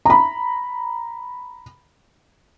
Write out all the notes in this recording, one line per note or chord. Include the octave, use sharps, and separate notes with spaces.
A#5 B5